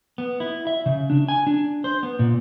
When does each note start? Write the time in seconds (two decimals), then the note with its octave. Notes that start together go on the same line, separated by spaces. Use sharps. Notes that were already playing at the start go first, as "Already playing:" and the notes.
0.18 B3
0.40 E4
0.67 E5
0.86 C#3
1.10 D4
1.29 G#5
1.47 D4
1.84 C5
2.03 B3
2.19 A#2